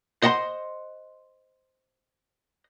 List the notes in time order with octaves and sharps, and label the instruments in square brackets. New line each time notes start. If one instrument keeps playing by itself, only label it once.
[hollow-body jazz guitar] C5 D#5 F#5 A#5 C6